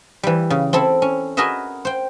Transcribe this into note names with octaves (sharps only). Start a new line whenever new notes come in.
E3 G3
C#3
C4 E4 A4
C#4
F#4 G#4 A#4 B4 D#5 E5
C5 G5